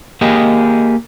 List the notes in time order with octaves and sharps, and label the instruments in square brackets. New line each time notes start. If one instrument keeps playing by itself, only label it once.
[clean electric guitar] A#3 G4 G#4 D#5